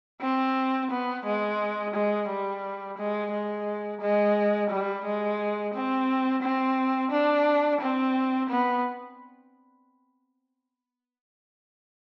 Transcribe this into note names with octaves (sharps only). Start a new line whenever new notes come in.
C4
B3
G#3
G#3
G3
G#3
G#3
G#3
G3
G#3
C4
C4
D4
C4
B3